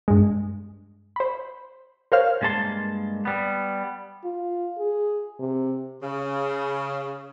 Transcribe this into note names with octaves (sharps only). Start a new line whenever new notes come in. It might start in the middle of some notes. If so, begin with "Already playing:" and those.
G2 G#3
C5 B5
A#4 C5 C#5 F5 F6
G2 G#3 A#3 A5 C6
G3 B3
F4
G#4
C3
C#3